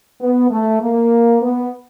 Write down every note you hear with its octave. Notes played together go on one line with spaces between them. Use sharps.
B3
A3
A#3
B3